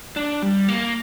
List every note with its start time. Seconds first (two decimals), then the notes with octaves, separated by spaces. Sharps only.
0.16 D4
0.42 G3
0.68 A#3